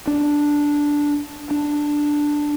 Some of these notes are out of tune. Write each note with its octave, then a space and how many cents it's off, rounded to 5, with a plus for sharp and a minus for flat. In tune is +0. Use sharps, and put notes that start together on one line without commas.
D4 -5
D4 +5